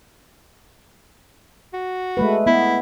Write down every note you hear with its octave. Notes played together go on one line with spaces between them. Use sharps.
F#4
G#3 A3 B4
B3 E4